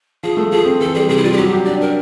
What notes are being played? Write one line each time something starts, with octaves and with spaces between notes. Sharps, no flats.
F3 G#4
A3
F3 G#4
C4
E3 A4
G3 G#4
C3 G#4
E4
G3 F4
G#4
F#3 G4
G4
D4 D5
D4 A#4